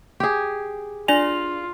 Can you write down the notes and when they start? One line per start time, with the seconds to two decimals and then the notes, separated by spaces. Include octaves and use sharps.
0.20 G4 G#4
1.08 D4 F4 D5 G#5 F7